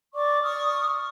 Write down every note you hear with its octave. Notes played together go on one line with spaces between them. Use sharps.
D5 C#6 D6
C#6 D#6 F6